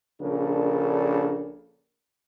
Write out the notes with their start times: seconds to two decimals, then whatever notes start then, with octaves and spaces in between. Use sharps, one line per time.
0.22 A#1 C#3 D4 A4 A#4